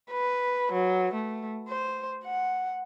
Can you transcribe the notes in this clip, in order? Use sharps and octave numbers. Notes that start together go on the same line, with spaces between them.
B4
F#3
A3
C5
F#5